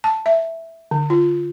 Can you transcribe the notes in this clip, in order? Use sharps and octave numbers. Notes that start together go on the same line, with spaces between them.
A5
E5
D3
F4